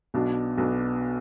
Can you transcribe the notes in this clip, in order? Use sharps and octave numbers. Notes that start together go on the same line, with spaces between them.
B1 B2 B3 D4
B1 B2 B3 D4